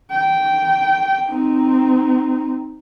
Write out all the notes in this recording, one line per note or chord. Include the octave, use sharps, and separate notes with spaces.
G5
C4 D#4